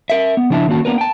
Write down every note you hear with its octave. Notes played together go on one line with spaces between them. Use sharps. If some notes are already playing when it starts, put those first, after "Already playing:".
A#4 E5
B3
C#3 F3 D4 E4 E5 A5
D#3 A#3 C#4 F#4 A5
A#3 B3 D4 A#4 B4
G5 A5